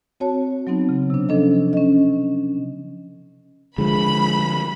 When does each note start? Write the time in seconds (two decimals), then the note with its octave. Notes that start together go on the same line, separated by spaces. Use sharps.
0.20 C4 F#4 C#5 A5
0.67 F#3 B3 C4 D#4
0.89 C#3
1.10 C3 D4
1.29 F3 C#4 D4 A4 D#5
1.73 C#4 D#5
3.78 D3 F3 G#3 B5